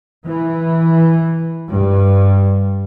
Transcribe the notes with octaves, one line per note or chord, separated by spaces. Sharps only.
E3
G2